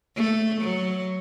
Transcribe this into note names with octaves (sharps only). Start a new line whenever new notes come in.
A3
F#3